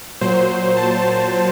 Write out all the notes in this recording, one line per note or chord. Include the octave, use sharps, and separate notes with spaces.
A#2 F#3 C5
A5